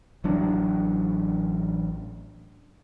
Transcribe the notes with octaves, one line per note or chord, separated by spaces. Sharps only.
A1 F#3 D4